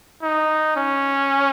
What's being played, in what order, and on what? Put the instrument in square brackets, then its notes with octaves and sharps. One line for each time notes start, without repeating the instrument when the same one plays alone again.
[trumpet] D#4
C#4